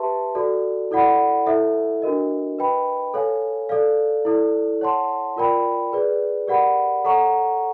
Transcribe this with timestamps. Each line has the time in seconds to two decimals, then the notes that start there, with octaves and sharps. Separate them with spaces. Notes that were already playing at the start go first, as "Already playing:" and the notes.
Already playing: G4 B4 E5 A5 C6
0.35 F#4 A4 D5
0.91 E4 A4 D5 F#5 B5
1.46 E4 A4 C5 E5
2.02 D4 F#4 A#4 D#5
2.59 B4 D#5 G5 B5
3.14 A4 C#5 F5 G#5
3.69 A4 D5 F5
4.25 E4 A4 D5
4.81 C#5 F#5 A5 C6
5.36 F4 A#4 D5 G5 B5
5.92 G#4 B4 D5
6.48 G4 A#4 D5 F#5 B5
7.04 A4 C#5 F#5 A#5 C#6